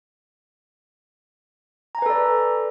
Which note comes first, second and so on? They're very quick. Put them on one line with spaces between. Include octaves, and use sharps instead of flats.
A#5 G#5 B4 A4 D5